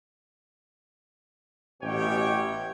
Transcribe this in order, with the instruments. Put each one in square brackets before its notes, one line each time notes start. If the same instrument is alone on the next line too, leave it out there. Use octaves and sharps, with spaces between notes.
[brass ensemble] A1 B2 G4 C#5 G5